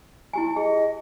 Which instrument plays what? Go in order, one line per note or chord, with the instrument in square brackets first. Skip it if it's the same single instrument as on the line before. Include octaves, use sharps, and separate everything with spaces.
[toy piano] E4 G4 G#5
[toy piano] G#4 [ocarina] D#5